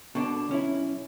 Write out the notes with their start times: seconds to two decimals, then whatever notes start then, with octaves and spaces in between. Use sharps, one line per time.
0.15 B2 D3 D4
0.49 B1 C#4 E4